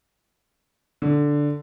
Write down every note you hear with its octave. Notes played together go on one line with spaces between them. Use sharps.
D3